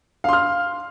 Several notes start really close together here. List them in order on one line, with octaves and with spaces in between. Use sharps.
F5 C6 F6